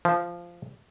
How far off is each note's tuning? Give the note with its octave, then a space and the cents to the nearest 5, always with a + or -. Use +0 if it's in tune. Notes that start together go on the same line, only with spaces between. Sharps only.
F3 -10